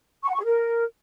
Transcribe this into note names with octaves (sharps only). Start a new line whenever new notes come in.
C#6
F#5
C#6
G#4
A#4